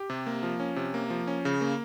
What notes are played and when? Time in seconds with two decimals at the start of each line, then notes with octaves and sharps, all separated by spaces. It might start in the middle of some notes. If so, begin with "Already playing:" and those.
Already playing: G4
0.10 C3
0.27 A#3
0.43 F3
0.60 C#4
0.76 C3
0.94 A#3
1.10 F3
1.27 C#4
1.45 C#3
1.61 A#3